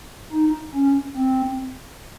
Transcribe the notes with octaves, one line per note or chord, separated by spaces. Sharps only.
D#4
C#4
C4